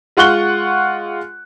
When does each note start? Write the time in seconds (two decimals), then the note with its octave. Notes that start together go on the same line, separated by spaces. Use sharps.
0.17 G#3 F4 F#5 C#6 F#6 G7